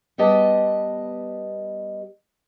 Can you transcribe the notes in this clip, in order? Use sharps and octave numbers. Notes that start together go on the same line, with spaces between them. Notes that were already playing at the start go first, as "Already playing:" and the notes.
G3 B3 G4 D#5 A5